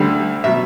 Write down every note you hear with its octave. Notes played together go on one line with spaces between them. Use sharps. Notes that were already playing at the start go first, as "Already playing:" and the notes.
Already playing: D2 D3 G3
B2 F#3 E5